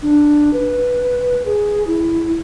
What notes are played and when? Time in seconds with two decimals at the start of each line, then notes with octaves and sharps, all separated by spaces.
0.02 D4
0.53 B4
1.46 G#4
1.87 E4